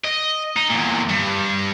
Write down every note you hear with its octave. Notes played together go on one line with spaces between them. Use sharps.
D#5
D#4
E2 A#2
G2